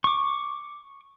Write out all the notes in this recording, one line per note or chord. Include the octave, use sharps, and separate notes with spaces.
C#6 D6